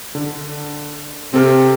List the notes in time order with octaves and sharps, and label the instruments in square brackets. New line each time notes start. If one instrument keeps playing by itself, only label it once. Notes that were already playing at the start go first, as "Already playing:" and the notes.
[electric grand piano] D3
[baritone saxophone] C3 [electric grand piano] C4 A4 F6